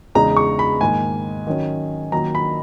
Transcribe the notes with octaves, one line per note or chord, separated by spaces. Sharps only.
E2 C#3 G#3 D#4 A#5
C#6
B5
G#2 D#3 A#3 G#5
D#3 F#3 C#4
D#3 F#3 A#3 D#4 A#5
B5